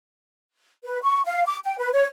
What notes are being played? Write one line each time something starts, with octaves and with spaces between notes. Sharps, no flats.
B4
C#6
F5
D6
G5
B4
C#5